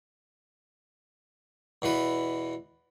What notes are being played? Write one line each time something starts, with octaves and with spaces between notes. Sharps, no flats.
E2 B2 E3 B4